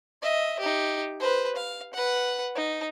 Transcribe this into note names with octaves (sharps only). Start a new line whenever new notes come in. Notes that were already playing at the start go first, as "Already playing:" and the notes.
D#5 E5
D#4 G4
B4 C5
F5
B4 F#5
D#4